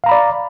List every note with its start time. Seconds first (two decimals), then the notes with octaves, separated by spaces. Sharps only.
0.04 F5
0.06 A#5
0.09 B5
0.12 D5